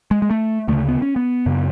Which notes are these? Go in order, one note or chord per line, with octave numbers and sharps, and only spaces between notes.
G#3
G#3
A3
D2 C#3 A3
B3
C#4
B3
F#2 C#3